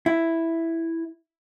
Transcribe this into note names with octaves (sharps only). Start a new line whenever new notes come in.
E4